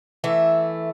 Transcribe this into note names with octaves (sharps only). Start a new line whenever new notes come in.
E3 A3 E5